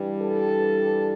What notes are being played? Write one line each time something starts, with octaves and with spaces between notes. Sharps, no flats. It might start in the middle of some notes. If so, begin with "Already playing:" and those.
Already playing: G2 E3 G3
A4